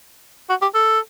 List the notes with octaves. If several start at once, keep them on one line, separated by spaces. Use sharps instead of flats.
F#4
G4
A4